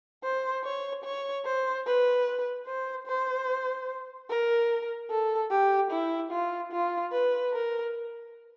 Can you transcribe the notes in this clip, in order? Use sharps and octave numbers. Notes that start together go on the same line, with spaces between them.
C5
C#5
C#5
C5
B4
C5
C5
A#4
A4
G4
E4
F4
F4
B4
A#4